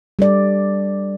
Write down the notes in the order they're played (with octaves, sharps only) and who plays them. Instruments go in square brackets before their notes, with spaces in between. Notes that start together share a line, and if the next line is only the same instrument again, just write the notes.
[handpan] G3 A4 D5